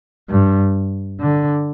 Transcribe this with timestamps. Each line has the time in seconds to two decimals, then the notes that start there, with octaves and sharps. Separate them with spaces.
0.30 G2
1.20 D3